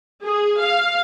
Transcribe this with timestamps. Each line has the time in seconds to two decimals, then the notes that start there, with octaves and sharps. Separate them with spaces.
0.24 G#4
0.61 F5